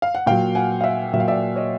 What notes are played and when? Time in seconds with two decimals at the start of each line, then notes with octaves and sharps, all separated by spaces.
0.02 F5
0.15 F#5
0.26 A#2 F#3 F5 G5
0.55 F#5 G#5
0.81 F5
0.84 E5 F#5
1.13 A#2 F#3 E5
1.20 F5
1.28 D5 E5
1.56 C#5 D#5